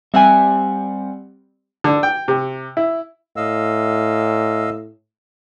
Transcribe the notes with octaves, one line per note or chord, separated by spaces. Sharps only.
G3 C4 E5 F#5 G#5
D3
G5
C3
E4
A2 D#5 F5 E6